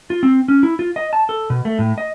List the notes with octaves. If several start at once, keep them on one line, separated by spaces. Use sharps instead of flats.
F4
C4
C#4
E4
F4
D#5
A5
A4
B2
A3
A2
D#5